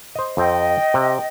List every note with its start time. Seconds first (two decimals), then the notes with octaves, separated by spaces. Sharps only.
0.15 C5 D#5
0.37 F2 C4 D#5 G5
0.94 C3